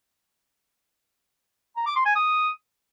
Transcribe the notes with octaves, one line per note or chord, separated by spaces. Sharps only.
A#5
D6
C6
G#5
D#6